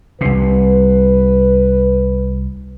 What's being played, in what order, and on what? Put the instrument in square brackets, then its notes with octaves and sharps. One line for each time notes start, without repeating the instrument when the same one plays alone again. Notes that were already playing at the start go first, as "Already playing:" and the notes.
[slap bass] C2 C3 [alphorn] B4